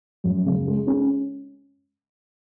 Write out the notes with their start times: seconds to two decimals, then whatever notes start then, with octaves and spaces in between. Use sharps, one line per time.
0.24 F#2
0.46 C#3
0.67 G#3
0.87 C#4